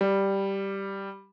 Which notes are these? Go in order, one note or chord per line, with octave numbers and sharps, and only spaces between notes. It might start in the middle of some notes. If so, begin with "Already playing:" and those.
G3